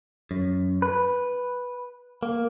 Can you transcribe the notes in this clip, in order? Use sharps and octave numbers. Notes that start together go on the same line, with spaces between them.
F#2
B4
A#3